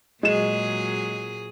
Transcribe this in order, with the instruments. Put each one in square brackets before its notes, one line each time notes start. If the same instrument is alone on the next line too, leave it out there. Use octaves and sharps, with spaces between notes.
[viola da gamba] A#2 F#3 G#4 [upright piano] G#3 E7